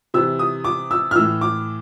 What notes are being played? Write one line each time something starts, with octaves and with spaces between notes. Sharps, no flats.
C3 E3 E6
D#6
D6
E6
F6
A2 E3 E6
D6